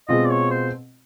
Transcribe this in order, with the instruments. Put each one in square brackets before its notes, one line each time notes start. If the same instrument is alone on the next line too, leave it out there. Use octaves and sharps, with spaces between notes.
[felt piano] B2 G#3 C4 F4 [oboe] D#5
[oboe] D5
C#5
C5